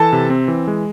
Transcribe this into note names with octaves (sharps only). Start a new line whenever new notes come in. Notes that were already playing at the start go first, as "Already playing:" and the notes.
Already playing: E3 A4 A5
C3
C4
E3
G#3